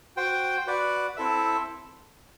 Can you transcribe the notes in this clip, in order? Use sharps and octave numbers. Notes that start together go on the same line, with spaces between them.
F#4 C5 G5
F#4 B4 D5 F#5
C4 E4 A4 E5